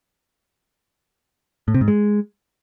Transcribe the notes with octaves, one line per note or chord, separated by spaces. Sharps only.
A2
C3
G#2
G#3